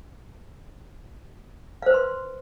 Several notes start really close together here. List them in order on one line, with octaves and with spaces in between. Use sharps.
F5 C5 B4 C6